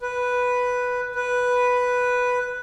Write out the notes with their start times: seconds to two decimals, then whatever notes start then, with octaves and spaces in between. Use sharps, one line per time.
0.02 B4
1.15 B4